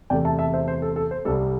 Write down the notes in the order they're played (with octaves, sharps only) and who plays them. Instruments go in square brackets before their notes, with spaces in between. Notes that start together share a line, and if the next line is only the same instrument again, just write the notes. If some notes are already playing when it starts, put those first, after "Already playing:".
[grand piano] E2 C3 A3 D5 G5
E5 A5
E5 A5
C5 E5
C5
A4
A4
C5
C2 C3 G3 A4